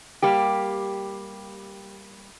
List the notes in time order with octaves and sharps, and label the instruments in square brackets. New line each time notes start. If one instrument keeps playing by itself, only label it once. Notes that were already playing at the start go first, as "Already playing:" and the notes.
[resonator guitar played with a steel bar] G3 A#3 G4